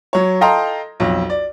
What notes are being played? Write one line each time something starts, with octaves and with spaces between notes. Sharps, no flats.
F#3 C#5
A4 D#5 F5 G5 A#5 C6
B1 F2
D5